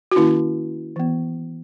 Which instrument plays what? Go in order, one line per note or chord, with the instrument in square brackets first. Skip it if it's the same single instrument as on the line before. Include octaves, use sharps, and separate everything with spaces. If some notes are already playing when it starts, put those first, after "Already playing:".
[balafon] F#4
D#3 A#3 C#4 E4
E3 B3